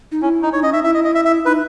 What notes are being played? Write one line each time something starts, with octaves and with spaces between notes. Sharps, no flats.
D#4
C#4 E4
D#4
D#4 C#5
C#4 D#5
D#4 E5
E4 E5
D#5
D#5
E5
E5
D#4 B4